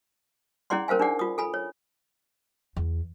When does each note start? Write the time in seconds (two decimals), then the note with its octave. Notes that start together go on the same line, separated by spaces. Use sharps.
0.70 C#4 E4 G#4 D5 F#5 C6
0.88 C#4 A#4 C5 F5 G#5
1.00 D4 D#4 G#4 D5 F#5
1.19 F4 D#6
1.38 A4 G#5 B5
1.54 C#5
2.76 E2